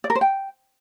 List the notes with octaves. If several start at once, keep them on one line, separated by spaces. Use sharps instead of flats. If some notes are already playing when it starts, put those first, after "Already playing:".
D5
A#4
C5
G5